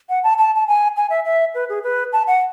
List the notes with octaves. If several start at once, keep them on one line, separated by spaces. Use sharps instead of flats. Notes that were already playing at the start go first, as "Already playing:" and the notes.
F#5
A5
A5
A5
G#5
G#5
E5
E5
B4
G#4
B4
A5
F#5